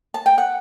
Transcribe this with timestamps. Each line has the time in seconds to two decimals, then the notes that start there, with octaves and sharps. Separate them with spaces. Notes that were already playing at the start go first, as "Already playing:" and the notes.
0.14 A5
0.26 G5
0.38 F#5